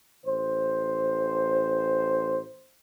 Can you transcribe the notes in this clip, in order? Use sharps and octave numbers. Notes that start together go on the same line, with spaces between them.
A1 C5